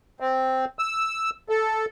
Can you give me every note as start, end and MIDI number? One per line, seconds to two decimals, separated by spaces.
0.20 0.65 60
0.79 1.30 88
1.49 1.85 69